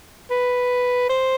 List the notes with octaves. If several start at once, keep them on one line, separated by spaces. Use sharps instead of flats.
B4
C5